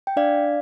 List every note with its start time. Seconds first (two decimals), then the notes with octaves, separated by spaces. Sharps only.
0.07 G5
0.16 D4 D5 F5